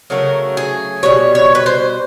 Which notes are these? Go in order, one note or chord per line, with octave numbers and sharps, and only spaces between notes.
C#3 F#3 A3 A#4
G#4
B2 G3 C#5
C#5
B4
C5